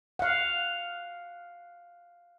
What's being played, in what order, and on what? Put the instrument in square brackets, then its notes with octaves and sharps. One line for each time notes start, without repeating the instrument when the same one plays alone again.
[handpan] F5 F#5